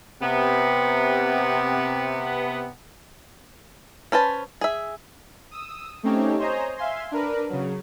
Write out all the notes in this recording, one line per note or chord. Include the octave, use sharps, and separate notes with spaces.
C3 B3
C#4 B4 C5 A5
G#4 E5
D#6 E6
A3 C4 C#4 D#4 G4 C#5
C5 C#5 D#5 G#5 A#5
E5 F5 G#5 C6
D4 A#4 B4
C#3 F#3